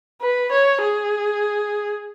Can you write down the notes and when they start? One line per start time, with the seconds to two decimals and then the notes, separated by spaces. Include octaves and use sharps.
0.21 B4
0.52 C#5
0.82 G#4